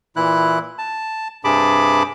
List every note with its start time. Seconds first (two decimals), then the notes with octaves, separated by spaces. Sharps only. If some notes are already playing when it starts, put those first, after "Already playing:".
0.16 A#2 E3 E4 F#6
0.78 A5
1.44 G2 C3 G#4 A5 B5 D6